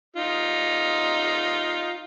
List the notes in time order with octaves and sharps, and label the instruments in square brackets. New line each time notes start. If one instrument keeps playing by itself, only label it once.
[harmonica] D#4 F4